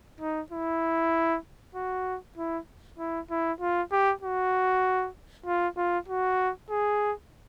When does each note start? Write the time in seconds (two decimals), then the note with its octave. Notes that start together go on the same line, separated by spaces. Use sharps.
0.21 D#4
0.52 E4
1.75 F#4
2.38 E4
2.99 E4
3.31 E4
3.61 F4
3.92 G4
4.23 F#4
5.46 F4
5.77 F4
6.08 F#4
6.70 G#4